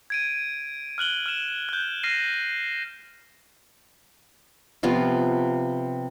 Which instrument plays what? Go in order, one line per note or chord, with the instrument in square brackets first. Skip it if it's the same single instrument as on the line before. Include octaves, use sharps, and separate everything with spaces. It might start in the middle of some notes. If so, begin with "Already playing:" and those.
[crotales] G#6 D7 D#7
F6 F#6 F#7 G7
F6 E7
F#6 G6
F6 A#6 C7 D#7
[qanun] C3 F3 B3 F4